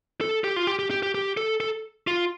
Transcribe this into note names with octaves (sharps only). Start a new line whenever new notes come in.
A4
G4
F4
G4
G4
G4
G4
G4
A4
A4
F4